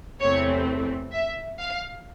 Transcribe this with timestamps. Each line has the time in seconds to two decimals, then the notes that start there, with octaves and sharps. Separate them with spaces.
0.21 E2 C3 E3 A3 C4 C#5
1.13 E5
1.60 F5